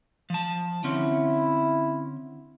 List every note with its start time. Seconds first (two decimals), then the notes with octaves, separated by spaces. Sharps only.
0.30 F3 A5
0.84 D3 C4 C#4 E4